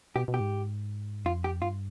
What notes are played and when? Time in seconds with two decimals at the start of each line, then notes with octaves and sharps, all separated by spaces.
0.16 B2 G4
0.28 B2
0.34 G4
0.40 G#2
1.25 F2 F4
1.44 G4
1.62 G2 F4